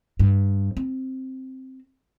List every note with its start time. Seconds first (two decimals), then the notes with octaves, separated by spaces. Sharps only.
0.19 G2
0.77 C4